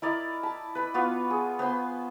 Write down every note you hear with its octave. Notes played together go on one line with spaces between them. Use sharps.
E4 A#4 D5 D#5
A5 B5
B4 B5
B3 F4 F#4
G#4
B3 C5 B5 C6